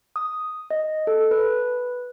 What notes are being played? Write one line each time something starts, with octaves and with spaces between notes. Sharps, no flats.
D#6
D#5
A4
B4